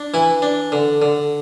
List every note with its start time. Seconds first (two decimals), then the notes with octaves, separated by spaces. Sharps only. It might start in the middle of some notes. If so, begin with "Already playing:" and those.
Already playing: D4
0.14 E3 E4
0.42 D4
0.72 D3
1.02 D3